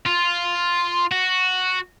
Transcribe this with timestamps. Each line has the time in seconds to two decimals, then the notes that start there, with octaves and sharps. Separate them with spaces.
0.06 F4
1.12 F#4